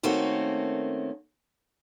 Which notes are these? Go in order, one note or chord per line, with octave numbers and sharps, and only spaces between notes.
D#3 A3 A#3 C4 C#4 F#4